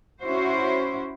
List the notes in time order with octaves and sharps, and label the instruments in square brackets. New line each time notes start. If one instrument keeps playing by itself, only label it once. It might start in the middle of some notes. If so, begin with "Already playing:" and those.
[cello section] C#4 E4 F#4 C5